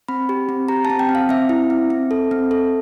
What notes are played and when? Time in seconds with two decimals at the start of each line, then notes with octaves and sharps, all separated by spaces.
0.08 C4 B5
0.29 G4
0.49 C4
0.68 G4 A#5
0.85 A5
0.90 C4
0.99 G5
1.09 C4
1.15 F5
1.29 C4 E5
1.49 E4
1.70 C4
1.90 C4
2.11 A4
2.31 C4
2.51 A4